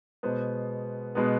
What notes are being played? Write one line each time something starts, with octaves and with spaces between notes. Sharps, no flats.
B2 G#3 B3 C5
B2 G#3 B3